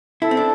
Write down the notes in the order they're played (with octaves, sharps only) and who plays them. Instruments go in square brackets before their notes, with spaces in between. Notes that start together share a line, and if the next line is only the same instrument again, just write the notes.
[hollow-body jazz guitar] E4 [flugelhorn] A4
[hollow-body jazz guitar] C4
D4